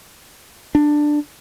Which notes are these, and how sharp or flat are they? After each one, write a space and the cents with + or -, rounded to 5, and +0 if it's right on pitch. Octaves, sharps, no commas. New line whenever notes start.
D4 +10